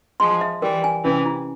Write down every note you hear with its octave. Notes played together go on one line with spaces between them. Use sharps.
F3 G#3 C6
E5
E3 G3 A#4
G#5
C3 E3 C#4
E4